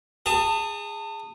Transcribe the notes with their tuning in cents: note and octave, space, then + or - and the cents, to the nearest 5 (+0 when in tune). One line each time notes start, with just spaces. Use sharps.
G#4 -15 A5 +30